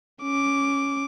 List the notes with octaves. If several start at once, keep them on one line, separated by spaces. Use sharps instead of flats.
C#4 D6